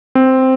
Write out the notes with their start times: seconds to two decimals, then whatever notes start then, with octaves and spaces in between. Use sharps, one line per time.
0.15 C4